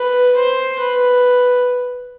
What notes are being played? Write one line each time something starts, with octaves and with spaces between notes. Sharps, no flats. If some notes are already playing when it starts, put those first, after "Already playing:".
Already playing: B4
C5
B4